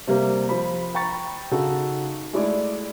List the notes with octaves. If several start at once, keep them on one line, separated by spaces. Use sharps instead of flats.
C3 G3 A#3
F3 B5
G5 A#5 B5 C#6 A6
C#3 D#4 F#4 A4
G#3 A3 E4 D5